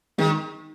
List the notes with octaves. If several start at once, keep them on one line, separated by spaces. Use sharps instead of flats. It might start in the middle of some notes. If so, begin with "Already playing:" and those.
D#3 G#3